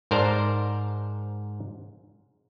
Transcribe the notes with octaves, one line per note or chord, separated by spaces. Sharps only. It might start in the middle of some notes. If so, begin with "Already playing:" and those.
G#2 A#4 C5 D5 A5